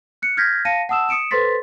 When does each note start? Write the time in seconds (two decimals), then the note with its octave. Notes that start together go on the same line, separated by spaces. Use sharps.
0.22 F#6 C#7
0.37 F6 G6 G#6 A#6 B6
0.65 F5 A5 A#6 C#7 D#7
0.89 F#5 A5 D#6 E6 E7
1.09 D#6 C#7 D7 E7
1.31 A4 B4 C5 C6 A6 B6